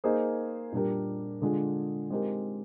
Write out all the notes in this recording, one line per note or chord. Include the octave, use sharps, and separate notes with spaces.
A#3 D#4 G#4 C5
A#2 G3 D4 G4 A#4
D3 G#3 D4 F4 G#4
G#3 C4 D#4 G4 A#4